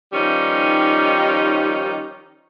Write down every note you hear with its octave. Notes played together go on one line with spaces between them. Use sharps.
D#3 F3 G3 C#4 D#4